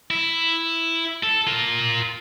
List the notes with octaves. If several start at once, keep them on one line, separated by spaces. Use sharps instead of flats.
E4
A4
F4 A#4